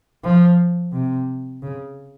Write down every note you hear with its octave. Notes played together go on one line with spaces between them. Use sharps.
F3
C3
C#3